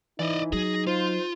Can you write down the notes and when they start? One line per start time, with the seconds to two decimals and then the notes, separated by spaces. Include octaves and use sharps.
0.19 E3 D#4 D5 D#5
0.53 F#3 G#4 A#6
0.87 F4 C5